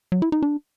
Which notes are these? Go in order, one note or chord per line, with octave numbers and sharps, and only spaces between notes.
F#3
E4
D#4
D4